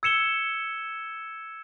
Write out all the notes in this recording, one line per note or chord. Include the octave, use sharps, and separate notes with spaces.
E6 G#6 C#7 E7 G7